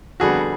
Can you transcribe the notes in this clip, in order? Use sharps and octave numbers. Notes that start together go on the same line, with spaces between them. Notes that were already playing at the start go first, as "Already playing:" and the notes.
F2 D3 G3 B3 F#4 G#4